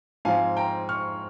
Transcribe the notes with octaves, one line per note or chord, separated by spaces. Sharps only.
G#2 F3 C4 F5 G#5
G5 A#5
C#6 F6